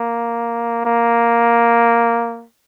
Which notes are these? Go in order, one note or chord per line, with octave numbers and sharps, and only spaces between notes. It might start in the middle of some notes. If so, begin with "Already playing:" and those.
Already playing: A#3
A#3